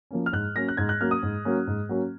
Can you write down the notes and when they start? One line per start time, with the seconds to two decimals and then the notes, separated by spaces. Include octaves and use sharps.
0.11 F3 A#3 C#4
0.26 F6
0.33 G#2 F#6
0.56 F#3 A#3 C#4 A#6
0.68 F#6
0.77 G#2 G#6
0.89 F#6
1.00 F#3 A#3 C#4 F6
1.11 D#6
1.23 G#2
1.45 F#3 A#3 C#4
1.67 G#2
1.89 F#3 A#3 C#4